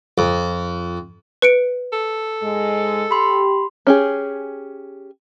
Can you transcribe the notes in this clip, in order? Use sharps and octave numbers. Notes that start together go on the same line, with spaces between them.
F2
B4 C#7 D7
A4
G#2 G#3
G4 B5 C6
C#4 G4 G#4